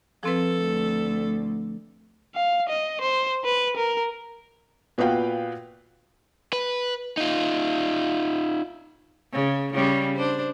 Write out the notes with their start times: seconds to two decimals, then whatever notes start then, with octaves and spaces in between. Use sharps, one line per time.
0.23 F3 C4 A4 B4
0.58 D2
2.35 F5
2.69 D#5
3.01 C5
3.45 B4
3.77 A#4
4.98 A#2 B3 F#4 B4 F5 G5
6.53 B4
7.17 D#4 F4
9.32 C#3
9.73 C#3 G3 C#4
10.16 D4 C5